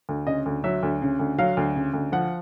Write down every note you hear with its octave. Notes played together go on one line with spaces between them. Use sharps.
D2
C#3 D#5
D2
F#3 E5
D2
C#3
D2
F#3 F5
D2
C#3
D2
F3 F#5